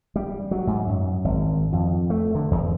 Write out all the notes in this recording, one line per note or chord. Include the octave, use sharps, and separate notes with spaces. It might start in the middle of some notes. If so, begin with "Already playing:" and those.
G3
F#3
G#2
F#2
G#1
F2
A3
D3
E2